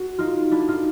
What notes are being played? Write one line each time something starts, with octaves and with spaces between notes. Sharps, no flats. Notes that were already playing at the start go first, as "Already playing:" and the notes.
Already playing: F#4
D#4 F4
D4 E4
D#4 F4